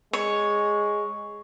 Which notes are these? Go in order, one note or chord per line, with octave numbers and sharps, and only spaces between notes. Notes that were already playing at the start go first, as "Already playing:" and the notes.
G#3 C#5